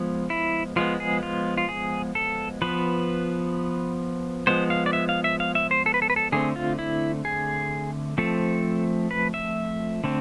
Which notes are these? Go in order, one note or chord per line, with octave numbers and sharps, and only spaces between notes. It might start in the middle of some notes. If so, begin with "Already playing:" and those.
Already playing: F3 G#3 B3
E4
F3 G#3 B3 F4
G#4
F4
F4
G#4
A4
F3 B3 B4
F3 G#3 B3 C5
F5
D5
E5
F5
E5
F5
E5
C5
A4
B4
A4
B4
A4
D3 A3 C4 G#4
F4
E4
G#4
F3 A3 C4 A4
B4
E5
D3 A3 C4